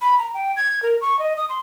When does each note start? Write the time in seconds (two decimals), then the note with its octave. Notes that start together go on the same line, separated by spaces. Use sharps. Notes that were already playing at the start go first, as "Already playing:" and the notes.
0.01 B5
0.19 A#5
0.34 G5
0.56 G#6
0.83 A#4
1.01 C#6
1.19 D#5
1.37 D#6
1.49 C6